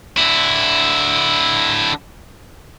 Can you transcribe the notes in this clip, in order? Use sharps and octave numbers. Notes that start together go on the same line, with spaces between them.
D3 E4